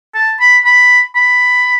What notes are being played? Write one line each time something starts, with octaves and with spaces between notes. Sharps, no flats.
A5
B5
B5
B5